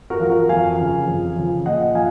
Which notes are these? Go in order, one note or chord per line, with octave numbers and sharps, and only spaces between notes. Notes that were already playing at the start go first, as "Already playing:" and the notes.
F#4 A#4
F3
F#4 A#4
F2 F5 G#5
C#3 F3
F2
C#3 F3
A#2 D#5 F#5
F3 F5 G#5